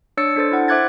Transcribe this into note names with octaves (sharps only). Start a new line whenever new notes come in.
D4 C#5 E6 A6 C#7
D4 A4 C5 A6
E4 F#5
C5 E5 D6 F#6 G#6 A6